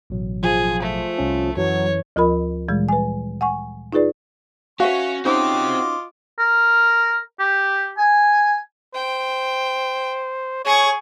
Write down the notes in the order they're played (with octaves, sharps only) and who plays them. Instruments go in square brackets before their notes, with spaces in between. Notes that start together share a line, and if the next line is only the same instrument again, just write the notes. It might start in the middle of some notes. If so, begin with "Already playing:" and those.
[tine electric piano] A1 B2 F#3
[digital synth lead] F3 [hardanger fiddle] G#4
[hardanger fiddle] A3
[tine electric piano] C2 C#4
[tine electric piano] F#2 E3 [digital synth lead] F#3 [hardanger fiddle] C#5
[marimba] D2 F3 F4 A#4 B5
A#2 E3 G3 G#3
B4 G#5
F#5 G#5 C#6
D#4 F4 G#4 B4 D5
[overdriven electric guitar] C#4 [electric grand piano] F#4 [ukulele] B4 E5 F5 [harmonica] C#6
[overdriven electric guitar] C4 G4 [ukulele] C#4 D#4 C5 [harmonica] F4 D#5 D6
[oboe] A#4
G4
G#5
[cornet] C5 [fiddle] G5
[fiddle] G#4 C#6 [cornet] C#5